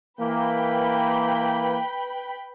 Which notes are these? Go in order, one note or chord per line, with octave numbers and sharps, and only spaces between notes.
E3 A#3 B4 G5 B5